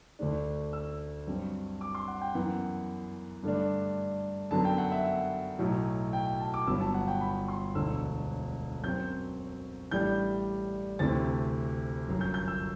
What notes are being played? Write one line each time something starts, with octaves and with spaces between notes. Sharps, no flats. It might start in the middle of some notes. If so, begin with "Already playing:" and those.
D2 D3 A3 D4
E6
G2 F#3 C4
D6
C6
F#5
G5
F#2 E3 B3 F#5
G2 D3 A3 D4
F#2 D3 F#3 B3 A5
G5
F#5
E5
F#5
B1 A2 F#3
G5
G5
A5
D6
G1 G2 F#3 B3 E6
A5
F#5
G5
B5
C6
E1 D2 D3 E6
F#2 F#3 C4 G6
A1 A2 G3 D4 G6
D2 C3 E3 A3 C4 A6
G1 F#2 F#3
G6
G6
E6